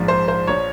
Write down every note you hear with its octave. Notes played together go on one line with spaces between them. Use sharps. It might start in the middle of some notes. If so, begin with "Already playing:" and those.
Already playing: A#1 G#2 F3
C5
C5
A#1 F3 C#5